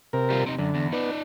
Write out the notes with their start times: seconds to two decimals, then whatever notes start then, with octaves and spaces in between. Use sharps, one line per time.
0.13 C3 A#4
0.30 G3 F4
0.46 C3 D#4
0.58 F#2 D3
0.75 E2
0.93 B3 D#4 D5